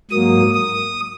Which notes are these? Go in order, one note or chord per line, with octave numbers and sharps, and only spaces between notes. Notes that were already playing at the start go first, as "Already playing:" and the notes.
G#2 F#3 A#3 D#6
D#6